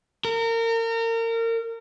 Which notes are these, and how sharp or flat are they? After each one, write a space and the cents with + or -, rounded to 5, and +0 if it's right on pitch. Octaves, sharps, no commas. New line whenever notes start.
A#4 -30